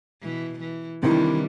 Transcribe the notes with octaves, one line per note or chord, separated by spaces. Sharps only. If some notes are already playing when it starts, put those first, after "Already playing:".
B2 E3
E3
C3 D#3 E3 G3 D4 E4